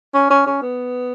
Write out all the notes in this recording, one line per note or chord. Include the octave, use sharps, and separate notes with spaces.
C#4
C#4
C#4
B3